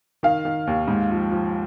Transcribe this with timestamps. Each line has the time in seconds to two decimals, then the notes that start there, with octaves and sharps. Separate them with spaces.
0.23 D#3 F5
0.45 D#3
0.67 D#2
0.88 G#2
1.10 F3
1.31 F3